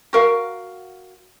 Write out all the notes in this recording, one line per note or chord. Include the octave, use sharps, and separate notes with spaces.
F#4 A#4 F5